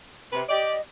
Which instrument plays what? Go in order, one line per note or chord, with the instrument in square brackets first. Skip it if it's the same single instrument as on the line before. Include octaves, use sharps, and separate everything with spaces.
[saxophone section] C3 B4
[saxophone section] G4 D5 [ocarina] D#5